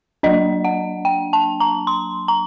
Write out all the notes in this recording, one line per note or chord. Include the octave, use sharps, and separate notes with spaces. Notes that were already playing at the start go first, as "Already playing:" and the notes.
F#3 A#3 D4 D#5
F#5
G5
A5
A#5
C6
A#5